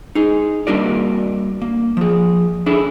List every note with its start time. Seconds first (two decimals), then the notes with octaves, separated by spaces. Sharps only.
0.15 D#4 G#4
0.67 G3 A#3 D4 F#4 A#4 D5
1.62 A#3
1.97 F3 G#4
2.66 D4 E4 G#4 A4